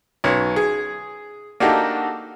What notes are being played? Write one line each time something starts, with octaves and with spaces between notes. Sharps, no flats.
B1 C#4
G#4
A#3 D4 D#4 F#4 G4 A4